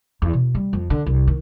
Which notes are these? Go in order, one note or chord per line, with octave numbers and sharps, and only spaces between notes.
E2
B2
G3
F2
D3
C2
D#3